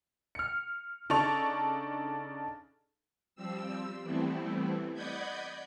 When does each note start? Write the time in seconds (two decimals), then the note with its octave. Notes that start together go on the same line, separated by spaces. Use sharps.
0.35 F6 C#7
1.10 C#3 D4 D#4 A4 C#6 F7
3.36 F3 G3 C4 E6
4.03 E3 G3 A3 B3 C4 E4
4.94 D5 D#5 F#5 B5 G6 G#6